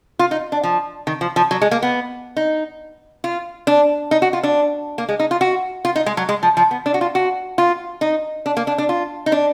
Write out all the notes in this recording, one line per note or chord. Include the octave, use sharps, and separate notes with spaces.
F4
D#4
D4
F3
D#3
F3
F3
F#3
G#3
A#3
B3
D#4
F4
D4
D#4
F#4
F4
D4
A#3
G#3
D#4
F4
F#4
F4
D#4
G#3
F#3
G#3
F3
F3
B3
D4
F#4
F4
F#4
F4
D#4
D4
A#3
D4
D4
F4
D#4
D4